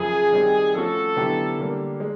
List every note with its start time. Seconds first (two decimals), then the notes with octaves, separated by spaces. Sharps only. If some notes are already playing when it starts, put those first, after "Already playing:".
Already playing: F#2 C#3 F3 G#4
0.32 D#3 G3 C4
0.74 F3 A3 C#4 F#4 A4
1.16 D3 F#3 B3 E4 G4
1.58 D3 G3 A#3
2.00 G#3